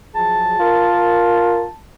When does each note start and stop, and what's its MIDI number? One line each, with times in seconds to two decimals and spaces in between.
0.15 0.59 53
0.15 0.59 54
0.15 0.59 68
0.15 1.75 81
0.60 1.69 65
0.60 1.62 70